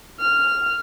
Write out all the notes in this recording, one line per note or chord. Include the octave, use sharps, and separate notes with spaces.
F6